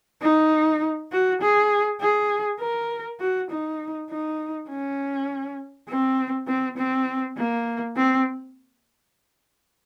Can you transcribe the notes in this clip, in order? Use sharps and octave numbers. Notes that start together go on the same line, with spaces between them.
D#4
F#4
G#4
G#4
A#4
F#4
D#4
D#4
C#4
C4
C4
C4
A#3
C4